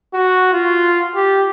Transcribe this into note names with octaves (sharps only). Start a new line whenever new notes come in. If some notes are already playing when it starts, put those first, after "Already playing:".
F#4
F4
G4